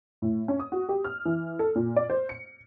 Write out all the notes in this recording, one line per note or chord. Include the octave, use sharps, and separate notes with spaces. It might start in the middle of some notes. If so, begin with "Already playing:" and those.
A2
C#4
D#6
F#4
G4
F6
E3
A4
A#2
D5
C5
C#7